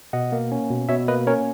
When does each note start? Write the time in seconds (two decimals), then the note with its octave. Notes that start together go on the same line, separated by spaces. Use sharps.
0.13 B2 D#5 F#5
0.32 A#3
0.52 C#4
0.70 B2
0.89 B2 C#5 E5
1.08 A#3 B4 D#5
1.27 C#4 A#4 C#5